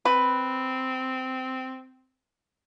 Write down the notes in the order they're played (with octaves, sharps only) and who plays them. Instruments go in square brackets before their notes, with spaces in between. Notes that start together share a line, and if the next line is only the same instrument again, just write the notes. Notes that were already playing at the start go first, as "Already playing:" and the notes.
[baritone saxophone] C4 [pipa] B4